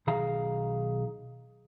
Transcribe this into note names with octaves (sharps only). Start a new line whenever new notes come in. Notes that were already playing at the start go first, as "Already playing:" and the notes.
B1 D#3 G#4 F5 A#5